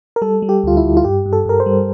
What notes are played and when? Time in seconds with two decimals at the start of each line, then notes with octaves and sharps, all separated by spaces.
0.16 A#4
0.22 G3 A4
0.42 G3
0.49 G4
0.64 D2 F4
0.77 E4
0.84 D2
0.97 F4
1.04 G2 G4
1.26 G2
1.33 A4
1.46 G2 A#4
1.60 C5
1.66 G3